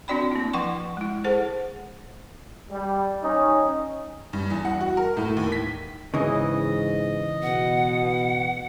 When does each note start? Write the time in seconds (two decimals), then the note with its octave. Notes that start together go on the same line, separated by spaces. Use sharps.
0.08 C4 D4 F#4 D5 G5 B5
0.32 A#3 E4
0.53 F3 B4 F#5 G5 C6 C#6
0.97 G#3 E4
1.24 G#4 A4 C5 F#5 A5
2.70 G3
3.23 C#4 D#4
4.33 G2
4.50 E2
4.65 F#5
4.81 F#4
4.97 A#4
5.17 A2
5.37 D#2
5.52 B6
6.14 G#2 C#3 E3 D#5
7.43 B2 F#5